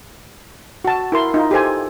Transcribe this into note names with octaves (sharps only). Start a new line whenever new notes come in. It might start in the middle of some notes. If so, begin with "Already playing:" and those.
F#4 A5
E4 A#4 C6
D#4 F4
G4 A4 C5 G#5